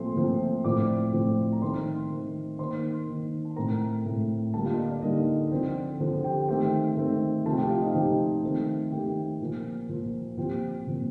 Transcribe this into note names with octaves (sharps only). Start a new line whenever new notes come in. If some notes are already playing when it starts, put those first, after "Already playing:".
Already playing: A#2 F3 A3 C4 C6
A#2 F3 A3 C4
A2 F3 A3 C4 D5 D6
A2 F3 A3 C4
A#5
D#3 A3 C4 C5 C6
D#3 A3 C4
D#3 A#3 C5 C6
D#3 A#3
A5
A2 A3 C4 A#4 A#5
A2 A3 C4
D3 G3 A#3 A4 A5
F4 F5
D#5
D5
D5
D3 G3 A#3 D#4 D#5
D3 F3 C4
D3 F3 C4
G4 G5
D#3 A3 C4 G4 G5
D#3 A3 C4
C3 F3 A3 C4 A4 A5
G4 G5
F4 F5
D#4 D#5
C3 F3 A3 C4 G4 G5
D#3 A3 C4
D#3 A3 C4 G4 G5
A#2 F3 A#3
A#2 F3 A#3
A#2 F3 C4 G4 G5
A#2 F3 C4